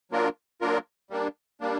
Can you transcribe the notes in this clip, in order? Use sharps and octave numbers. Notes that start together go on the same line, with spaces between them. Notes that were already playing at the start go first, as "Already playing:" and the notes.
F#3 A#3 D4 F4 A#4
F#3 A#3 D4 F4 A#4
G3 A#3 D4
G3 A#3 D4